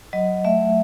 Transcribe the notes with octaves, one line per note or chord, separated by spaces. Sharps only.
F#3 D#5
A3 E5